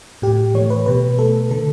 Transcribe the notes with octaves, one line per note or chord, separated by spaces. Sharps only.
A2 G4
E3 A3 C#5
B4
B2 B4
A3 A4
D3 A4